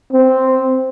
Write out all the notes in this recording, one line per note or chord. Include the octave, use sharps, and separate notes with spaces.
C4